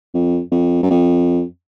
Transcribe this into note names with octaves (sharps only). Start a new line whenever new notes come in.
F2
F2
F#2
F2